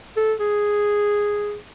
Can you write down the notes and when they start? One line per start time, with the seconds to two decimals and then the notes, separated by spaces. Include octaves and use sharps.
0.17 A4
0.40 G#4